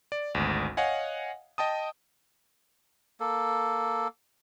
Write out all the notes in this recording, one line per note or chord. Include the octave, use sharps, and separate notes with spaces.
D5
G#1 D2
C#5 D#5 F5 F#5 G#5
D#5 G5 A5 D#6
A#3 A4